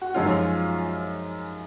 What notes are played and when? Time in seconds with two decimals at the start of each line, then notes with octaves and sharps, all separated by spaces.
0.02 F#4
0.14 F#2 F3 G#3 C#4 D#4 F4